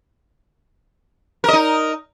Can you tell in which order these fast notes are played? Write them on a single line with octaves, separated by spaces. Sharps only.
A#4 D#5 D#4